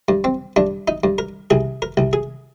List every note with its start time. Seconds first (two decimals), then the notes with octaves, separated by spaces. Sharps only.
0.08 G2
0.24 C4
0.56 G2 D4
0.88 D#4
1.04 G2
1.18 A#4
1.50 C2 G#4
1.82 A#4
1.97 C2
2.13 G#4